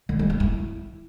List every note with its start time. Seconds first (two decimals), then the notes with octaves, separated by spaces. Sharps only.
0.09 D#3
0.19 G3
0.30 A#3
0.40 E4